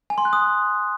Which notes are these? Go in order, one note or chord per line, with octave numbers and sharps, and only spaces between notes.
G#5
C6
F#6
D#6